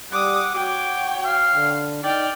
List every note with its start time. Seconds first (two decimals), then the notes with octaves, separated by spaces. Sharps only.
0.12 G3 F#5 D6 D#6
0.54 F#4 C#5 G5 D6
1.25 F5
1.54 D3
2.03 D#4 D5 G5 F6